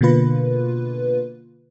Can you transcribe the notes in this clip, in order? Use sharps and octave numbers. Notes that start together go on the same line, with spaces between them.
B2 D3 A#3 F4 B4